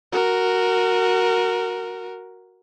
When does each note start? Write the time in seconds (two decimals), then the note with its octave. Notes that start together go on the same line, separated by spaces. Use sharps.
0.12 F#4 A#4